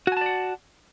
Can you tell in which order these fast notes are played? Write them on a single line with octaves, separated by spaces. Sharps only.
F#4 G#5 A5 D5 F#5